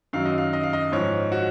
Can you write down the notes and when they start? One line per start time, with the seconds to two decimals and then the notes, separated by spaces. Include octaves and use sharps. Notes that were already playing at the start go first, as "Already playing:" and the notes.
0.13 F#2 D#3 F#3 F5
0.25 D#5
0.38 F5
0.53 D#5
0.63 F5
0.73 D#5
0.92 G#2 F3 C#5
1.32 F#4